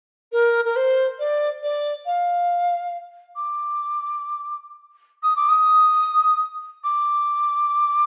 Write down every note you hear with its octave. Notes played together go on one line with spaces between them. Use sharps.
A#4
A#4
C5
D5
D5
F5
D6
D#6
D6
D#6
D6